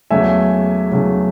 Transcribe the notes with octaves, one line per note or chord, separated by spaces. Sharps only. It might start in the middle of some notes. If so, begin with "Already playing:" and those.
E2 C#3 F#3 A3 E5 G#5
E2 C#3 F#3 A3